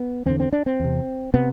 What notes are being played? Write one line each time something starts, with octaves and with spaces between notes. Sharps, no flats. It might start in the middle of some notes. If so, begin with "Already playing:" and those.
Already playing: B3
E2 D3 C4
C4
D4
C4
E2 C3
C3 B3